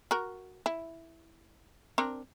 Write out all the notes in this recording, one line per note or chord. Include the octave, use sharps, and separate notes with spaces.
F#4 A#4
E4
C4 D4 A#4